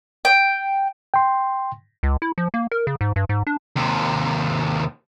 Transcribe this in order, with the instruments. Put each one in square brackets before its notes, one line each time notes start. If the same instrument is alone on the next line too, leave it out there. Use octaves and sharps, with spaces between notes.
[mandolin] G5
[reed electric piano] G5 C6
[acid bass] C#2
E4
F3
A#3
A#4
C#3
G#2
G2
G#2
D4
[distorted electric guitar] D#2 C3